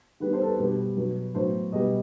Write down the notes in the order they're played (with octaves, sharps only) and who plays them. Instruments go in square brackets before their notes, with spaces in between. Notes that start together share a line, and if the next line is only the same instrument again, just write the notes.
[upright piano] D#3 G3 B3 B4
C5
A4
B4
B2 G3 B3
B2 F#3 B3
A2 F#3 B3 C5
B2 G3 B3 D#5